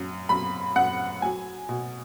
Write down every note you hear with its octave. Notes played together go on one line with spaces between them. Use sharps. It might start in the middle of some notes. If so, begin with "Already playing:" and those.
Already playing: F#2
F#2 B5
F#2 F#5
F#3 G#5
B2